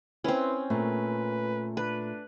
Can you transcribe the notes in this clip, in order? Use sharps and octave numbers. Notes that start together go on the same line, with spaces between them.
C4 C#4 E4 B4 C6
A#2 A3 B4
D4 B4